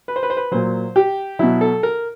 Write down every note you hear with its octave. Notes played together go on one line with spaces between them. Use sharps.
B4
C5
B4
C5
B4
A#2 F#3 C5
G4
B2 F#3 E4
A4
A#4